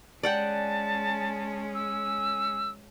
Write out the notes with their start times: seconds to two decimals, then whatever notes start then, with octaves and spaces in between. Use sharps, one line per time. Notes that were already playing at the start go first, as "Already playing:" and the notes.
0.23 G#3 C#4 D5 F#5 G5 A5
1.75 E6